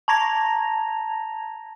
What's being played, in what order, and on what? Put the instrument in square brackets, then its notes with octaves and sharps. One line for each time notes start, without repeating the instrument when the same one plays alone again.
[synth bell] A5 A#5 G#6 A#6 F7